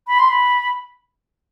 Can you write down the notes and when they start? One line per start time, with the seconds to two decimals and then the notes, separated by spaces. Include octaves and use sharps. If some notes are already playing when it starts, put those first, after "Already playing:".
0.07 B5
0.19 C6
0.29 B5